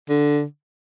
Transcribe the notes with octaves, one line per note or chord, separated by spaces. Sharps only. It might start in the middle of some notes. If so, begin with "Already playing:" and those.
D3